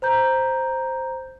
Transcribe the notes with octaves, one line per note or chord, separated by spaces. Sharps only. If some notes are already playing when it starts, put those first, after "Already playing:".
C5 A#5 G6